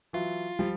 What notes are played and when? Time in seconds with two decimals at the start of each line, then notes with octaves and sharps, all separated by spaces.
0.13 E3 F#3 F4
0.59 F3 G3